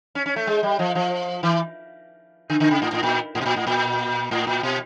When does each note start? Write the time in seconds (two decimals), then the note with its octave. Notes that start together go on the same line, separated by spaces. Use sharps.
0.15 C#4
0.26 C#4
0.36 A3
0.47 G#3
0.63 G3
0.79 F3
0.95 F3
1.43 E3
2.50 D3
2.60 D3
2.71 C#3
2.82 A2
2.93 A2
3.03 A#2
3.35 A2
3.41 B2
3.46 A#2
3.56 A2
3.67 A#2
4.31 A2
4.47 A#2
4.63 B2